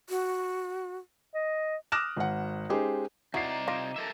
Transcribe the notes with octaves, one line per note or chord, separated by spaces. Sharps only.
F#4
D#5
D6 D#6 F6 F#6 A#6 E7
G#1 F#5
G#3 C#4 D#4 G4 G#4 C5
C3 D#4 E4 F#4 D5 A#5 C7
F4 D6 A#6
A4 A#4 E5